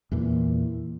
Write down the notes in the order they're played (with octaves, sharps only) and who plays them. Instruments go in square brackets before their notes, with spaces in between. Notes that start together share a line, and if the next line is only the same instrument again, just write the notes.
[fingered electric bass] E2 A#2 E3